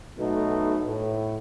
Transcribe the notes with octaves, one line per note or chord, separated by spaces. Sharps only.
B1 B2 A3 B3 D#4 F#4
A2